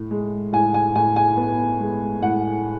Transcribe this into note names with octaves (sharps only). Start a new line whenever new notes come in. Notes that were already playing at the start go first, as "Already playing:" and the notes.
Already playing: A2
G#3
A2 G#5
G#5
A2 G#5
G#5
B3
G#3
A2 F#5